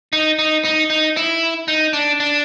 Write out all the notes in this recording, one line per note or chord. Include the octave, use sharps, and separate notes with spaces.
D#4
D#4
D#4
D#4
E4
D#4
D4
D4